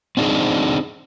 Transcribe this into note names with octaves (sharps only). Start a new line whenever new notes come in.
C4 D4 D#4 F4 G#4